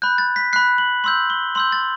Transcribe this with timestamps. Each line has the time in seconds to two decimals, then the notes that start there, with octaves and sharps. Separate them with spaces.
0.02 B5 F#6 G6
0.18 A6
0.36 B6
0.53 B5 F#6 C7
0.78 F#7
1.04 C6 E6 G6 F#7
1.30 G7
1.55 C6 E6 G6 F#7
1.72 A6